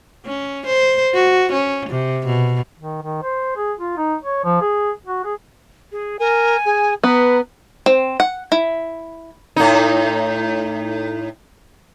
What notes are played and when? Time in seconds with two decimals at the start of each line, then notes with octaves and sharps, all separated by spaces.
0.26 C#4
0.66 C5
1.14 F#4
1.52 C#4
1.89 C3
2.26 B2
2.79 D#3
3.02 D#3
3.23 C5
3.57 G#4
3.79 F4
3.97 D#4
4.23 C#5
4.44 F3
4.61 G#4
5.06 F#4
5.25 G#4
5.92 G#4
6.19 A#4 G#5
6.65 G#4
7.04 B3 B4 A#5
7.86 C4
8.20 F#5
8.52 E4
9.56 A2 D#4